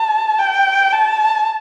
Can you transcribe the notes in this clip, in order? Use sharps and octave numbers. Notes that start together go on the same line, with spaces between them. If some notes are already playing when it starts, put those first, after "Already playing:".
Already playing: A5
G5
A5